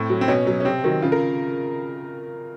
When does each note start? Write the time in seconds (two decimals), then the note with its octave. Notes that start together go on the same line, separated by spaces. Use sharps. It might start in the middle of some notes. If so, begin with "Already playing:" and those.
Already playing: A2 C4
0.10 F#3
0.21 C4
0.28 B2 C#4
0.47 F#3
0.60 C#4
0.65 C3 C4
0.84 D#3 F#3
1.02 C#3 F4
1.12 A#4